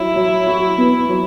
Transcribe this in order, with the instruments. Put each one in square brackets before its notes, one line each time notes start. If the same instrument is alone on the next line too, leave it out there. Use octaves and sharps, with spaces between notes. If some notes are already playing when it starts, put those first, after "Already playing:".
Already playing: [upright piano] F#3 [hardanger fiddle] E4
[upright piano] F#3
F#4
B3
F#3